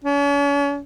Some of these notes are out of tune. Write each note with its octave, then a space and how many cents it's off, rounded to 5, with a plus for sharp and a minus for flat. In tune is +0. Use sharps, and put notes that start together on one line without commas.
C#4 +40